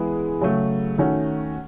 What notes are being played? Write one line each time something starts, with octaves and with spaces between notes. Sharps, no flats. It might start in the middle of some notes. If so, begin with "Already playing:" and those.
Already playing: E3 G#3 B3 E4 G#4
C#3 F#3 A3
D#3 A3 C#4 F#4